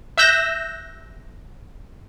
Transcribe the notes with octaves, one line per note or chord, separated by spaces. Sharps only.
E5 E6 F#6 G6 A#6 E7